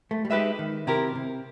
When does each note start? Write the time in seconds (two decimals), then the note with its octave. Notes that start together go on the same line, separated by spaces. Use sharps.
0.11 A3
0.25 G3
0.30 G#3 D#4 G4 B4 E5
0.59 D#3
0.87 C3 E4 G4 A#4
1.15 C3